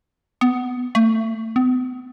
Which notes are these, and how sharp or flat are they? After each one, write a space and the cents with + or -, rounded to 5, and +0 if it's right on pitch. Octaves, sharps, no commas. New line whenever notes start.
B3 +15
A3 +30
B3 +45